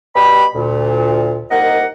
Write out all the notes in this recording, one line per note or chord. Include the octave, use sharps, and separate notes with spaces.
B2 G3 G4 B5
D2 A#2
C2 A#3 D#4 D#5 F#5